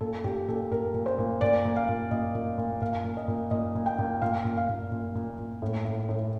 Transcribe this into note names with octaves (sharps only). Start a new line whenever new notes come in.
A#2 A4
A#2 G4
A#2 A4
A#2 A#4
A#2
C5
A#2
A#2 D5
A#2
F5
A#2
A#2 D#5
A#2
A#2
A#2 F5
A#2
D#5
A#2
A#2 D#5
A#2
G5
A#2
A#2 F5
A#2
F5
A#2
A#2
A#2
A#2
A2
A2
A2